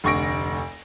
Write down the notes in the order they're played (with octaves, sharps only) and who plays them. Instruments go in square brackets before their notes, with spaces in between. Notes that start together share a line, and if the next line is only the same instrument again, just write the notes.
[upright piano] F1 D2 C#6 A#6 D7